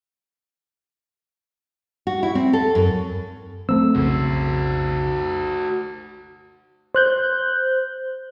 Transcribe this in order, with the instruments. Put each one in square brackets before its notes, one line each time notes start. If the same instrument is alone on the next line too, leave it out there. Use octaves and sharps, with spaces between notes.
[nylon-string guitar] F#4
E4
C4
A4
F#2
[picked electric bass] A3 A#3 C4 [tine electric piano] E6
[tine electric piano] B1 F2 C#3 [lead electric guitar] F#4 C5
[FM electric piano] C5 F#6 G6